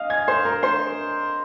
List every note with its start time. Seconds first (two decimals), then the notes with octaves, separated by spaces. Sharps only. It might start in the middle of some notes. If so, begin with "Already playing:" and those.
Already playing: D#5 F5 D#6 F6
0.10 G#5 G#6
0.28 C5 C6
0.45 A#4 A#5
0.63 C5 C6